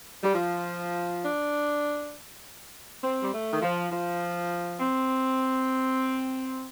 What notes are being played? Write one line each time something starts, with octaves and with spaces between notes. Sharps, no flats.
G3
F3
D4
C4
G3
A3
D#3
F3
F3
C4